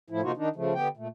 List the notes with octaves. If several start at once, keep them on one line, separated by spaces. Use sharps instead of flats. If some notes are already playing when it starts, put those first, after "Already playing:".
A2 F3 E4
C3 F3 A#3 D#4 F4 F#4
D#3 D4 D#4
C#3 F3 A3
D3 B3 G4 G5
A#2 A3